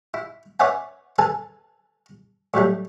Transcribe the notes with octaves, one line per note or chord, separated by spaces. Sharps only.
E4
B4 C#5 D5 E5 F#5 G#5
A4 B4 G#5 A5
A2 F#3 G3 A3